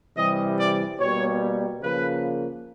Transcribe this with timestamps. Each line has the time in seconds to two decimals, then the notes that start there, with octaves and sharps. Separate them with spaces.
0.17 C3 E3 G3 D#5
0.59 D5
1.00 B2 G3 A#3 C#5
1.82 C#3 F3 A#3 B4